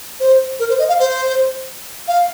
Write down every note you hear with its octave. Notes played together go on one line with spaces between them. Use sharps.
C5
A#4
C5
D#5
F5
C5
F5